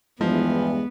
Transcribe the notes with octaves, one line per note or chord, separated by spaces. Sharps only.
E2 G2 E3 F3 G#3 B3